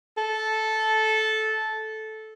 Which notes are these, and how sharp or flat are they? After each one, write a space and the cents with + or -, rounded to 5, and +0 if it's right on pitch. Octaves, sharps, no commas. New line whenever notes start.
A4 -10